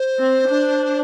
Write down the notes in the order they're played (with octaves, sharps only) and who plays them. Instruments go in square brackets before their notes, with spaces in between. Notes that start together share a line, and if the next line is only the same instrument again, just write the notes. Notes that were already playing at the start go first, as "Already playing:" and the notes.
Already playing: [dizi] C5
[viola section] C4
D4